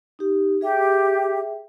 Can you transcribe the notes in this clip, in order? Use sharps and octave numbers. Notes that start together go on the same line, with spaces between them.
D#4 G4
G4 G#4 E5 G5